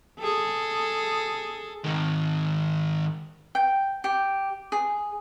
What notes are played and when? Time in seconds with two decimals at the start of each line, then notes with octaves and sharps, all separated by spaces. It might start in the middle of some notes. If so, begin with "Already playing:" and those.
0.21 G#4 A4
1.85 G#2 D#3
3.55 G5
4.04 G4
4.72 G#4